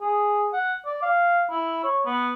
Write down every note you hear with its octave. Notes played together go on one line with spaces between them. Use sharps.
G#4
F#5
D5
F5
E4
C#5
B3